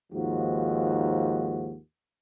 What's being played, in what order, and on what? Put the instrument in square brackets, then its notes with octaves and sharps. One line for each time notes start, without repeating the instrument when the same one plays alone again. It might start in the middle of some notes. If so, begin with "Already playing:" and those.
[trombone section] D#2 G#2 F3 F#4